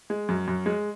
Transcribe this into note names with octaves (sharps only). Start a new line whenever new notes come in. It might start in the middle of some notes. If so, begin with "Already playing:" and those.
G#3
F#2
F#2
G#3